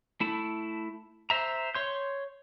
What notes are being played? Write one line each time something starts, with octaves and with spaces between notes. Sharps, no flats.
A3 E4 A5
C5 E5 A#5
C#5 C6 G6